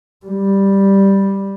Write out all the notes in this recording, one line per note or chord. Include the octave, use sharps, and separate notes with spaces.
G3